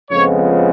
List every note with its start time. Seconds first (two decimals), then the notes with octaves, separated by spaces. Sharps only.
0.10 F2 C#3 F3 G#3 B3 C#5